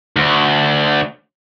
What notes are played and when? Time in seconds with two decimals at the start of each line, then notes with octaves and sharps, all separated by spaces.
0.16 D2